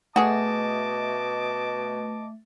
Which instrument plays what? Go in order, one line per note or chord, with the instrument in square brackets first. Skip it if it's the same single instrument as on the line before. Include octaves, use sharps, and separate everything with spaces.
[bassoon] B2 [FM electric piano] A3 E5 [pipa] F#4 G#4 [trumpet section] D#5 A5 D6